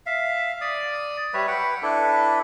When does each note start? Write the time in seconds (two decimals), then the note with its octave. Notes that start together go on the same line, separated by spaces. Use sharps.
0.06 E5 F5
0.61 D5 D#6
1.34 G3 B4 C#5 E5
1.48 B4 F#5 G5
1.83 D4 E4 A4 B4